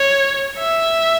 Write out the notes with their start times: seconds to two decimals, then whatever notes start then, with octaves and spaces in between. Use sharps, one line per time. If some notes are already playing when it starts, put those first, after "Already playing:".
Already playing: C#5
0.59 E5